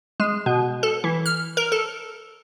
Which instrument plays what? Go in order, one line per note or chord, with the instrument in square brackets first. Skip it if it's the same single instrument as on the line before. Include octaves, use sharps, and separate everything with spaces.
[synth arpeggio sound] G#3
B2
A4
E3
F6
A#4
A4